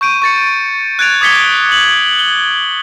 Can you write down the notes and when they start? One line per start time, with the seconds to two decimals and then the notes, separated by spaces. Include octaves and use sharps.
0.01 C#6 G6 D7 D#7
0.22 C#6 A6 C#7
0.99 F#6 G#6 A6 D7 F7
1.21 D6 D#6 G#6 B6 C#7 G7
1.72 F#7
2.19 G7